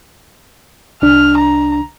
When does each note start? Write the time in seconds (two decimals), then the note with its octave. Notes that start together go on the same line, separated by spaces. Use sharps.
1.02 C2 D4 F6
1.38 A#5